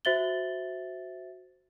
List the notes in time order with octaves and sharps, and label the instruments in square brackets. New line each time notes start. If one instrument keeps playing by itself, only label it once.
[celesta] F#4 C5 E5 A6 F#7 G7